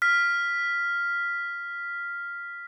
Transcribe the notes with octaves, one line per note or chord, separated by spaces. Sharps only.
F6 B6